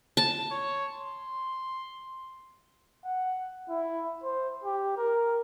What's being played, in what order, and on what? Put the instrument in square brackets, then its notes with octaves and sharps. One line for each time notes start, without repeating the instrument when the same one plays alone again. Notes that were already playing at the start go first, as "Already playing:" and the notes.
[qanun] A5
[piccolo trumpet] C#5
C6
[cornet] F#5
E4
C5
G4
A#4